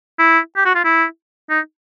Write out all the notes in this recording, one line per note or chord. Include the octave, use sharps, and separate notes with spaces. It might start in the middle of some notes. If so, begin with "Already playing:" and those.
E4
G4
F#4
F4
E4
D#4